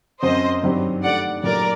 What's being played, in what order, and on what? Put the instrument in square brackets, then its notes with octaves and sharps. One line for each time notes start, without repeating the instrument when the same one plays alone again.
[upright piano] F#2 F#3 C4 [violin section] C5 D#5
[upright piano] G2 D#3 F#3 C4 G4
[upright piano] D#3 A3 D4 G4 [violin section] D5 F#5
[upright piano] A#2 F#3 A3 D#4 G4 [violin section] A#4 D5